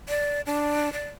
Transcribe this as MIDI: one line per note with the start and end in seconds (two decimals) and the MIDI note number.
0.09 0.41 74
0.46 0.92 62
0.93 1.09 74